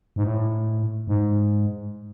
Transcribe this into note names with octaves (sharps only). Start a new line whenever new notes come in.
G#2
A2
G#2